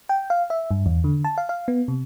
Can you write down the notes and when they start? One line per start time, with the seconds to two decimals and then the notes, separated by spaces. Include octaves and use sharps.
0.09 G5
0.30 F5
0.50 E5
0.71 G2
0.86 E2
1.04 D3
1.24 A5
1.38 F5
1.49 F5
1.68 B3
1.88 C3